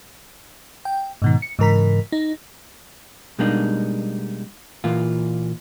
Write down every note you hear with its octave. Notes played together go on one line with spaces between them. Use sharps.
G5
G#2 B2 D#3
C#7
G#2 C#3 E3 A#4 A#5 B6
D#4
B2 G3 G#3 A#3 D4 D#4
A#2 E3 A#3 F4